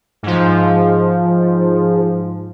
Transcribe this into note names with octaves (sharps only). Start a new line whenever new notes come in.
G#2 F3